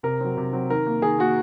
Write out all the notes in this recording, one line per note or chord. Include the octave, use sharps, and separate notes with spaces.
C3 A#4
F#3 C4
C3
F#3 C4
D#3 A#4
A#3
D#3 G#4
A#3 F#4